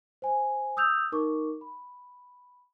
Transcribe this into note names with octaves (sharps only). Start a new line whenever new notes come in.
C5 G#5
D#6 E6 G6 F7
D#4 A#4 C#6 D6
B5